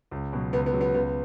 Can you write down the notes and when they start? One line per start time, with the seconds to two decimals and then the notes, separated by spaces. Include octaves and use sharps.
0.11 C#2
0.33 B2 F#3
0.53 C#2 B3
0.66 B3
0.73 C#3 F#3
0.81 B3
0.94 C#2 B3